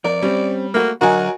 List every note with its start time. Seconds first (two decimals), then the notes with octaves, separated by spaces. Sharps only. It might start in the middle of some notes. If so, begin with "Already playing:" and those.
0.05 F2 A#4 D5
0.22 G3 C4 C#4
0.74 A3 A#3 F#4
1.01 D3 F#3 F#4 A#4 D#5 G#5